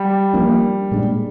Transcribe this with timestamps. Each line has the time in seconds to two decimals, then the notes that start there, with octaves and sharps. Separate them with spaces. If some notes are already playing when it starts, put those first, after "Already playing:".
Already playing: G3
0.33 F3 A#3 D4
0.91 A#2 G#3 D4